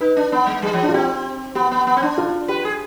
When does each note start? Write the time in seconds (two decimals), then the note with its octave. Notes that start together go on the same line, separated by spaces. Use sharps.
0.01 D#4 B4
0.17 D4
0.32 B3
0.47 G#3
0.62 G3 G#4
0.73 F3
0.83 D4
0.89 F4
0.94 C4 G4
1.55 B3 G4
1.72 B3
1.87 B3
1.97 C4
2.02 D4
2.18 F4
2.48 G4 B4
2.65 G#4